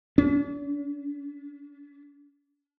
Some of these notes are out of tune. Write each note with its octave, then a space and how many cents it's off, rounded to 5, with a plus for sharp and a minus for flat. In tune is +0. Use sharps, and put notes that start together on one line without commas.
D4 -45